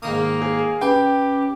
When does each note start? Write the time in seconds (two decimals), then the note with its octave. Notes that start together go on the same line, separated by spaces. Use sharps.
0.03 G#2 D#3 A#3 D#6
0.42 G#4
0.81 C#4 G4 B4 G5